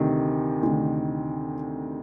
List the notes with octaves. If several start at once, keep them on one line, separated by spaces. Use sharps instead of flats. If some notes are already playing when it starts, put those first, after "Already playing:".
Already playing: D2 C3 D#3
D2 C3 D#3